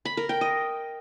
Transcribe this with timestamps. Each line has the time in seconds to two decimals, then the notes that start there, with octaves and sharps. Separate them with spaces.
0.05 B5
0.17 A#4
0.29 G5
0.41 D#5